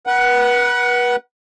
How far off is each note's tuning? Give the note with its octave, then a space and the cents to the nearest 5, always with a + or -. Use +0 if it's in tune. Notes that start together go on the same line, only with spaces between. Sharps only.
B4 -35 F#5 +10